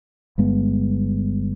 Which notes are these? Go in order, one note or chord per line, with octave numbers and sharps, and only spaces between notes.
G1 G2 G#3 B3